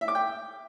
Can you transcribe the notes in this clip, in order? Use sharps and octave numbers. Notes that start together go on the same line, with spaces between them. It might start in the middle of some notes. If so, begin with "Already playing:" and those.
E5
D6
G5